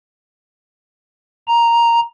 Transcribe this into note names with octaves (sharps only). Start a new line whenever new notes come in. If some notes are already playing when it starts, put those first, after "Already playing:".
A#5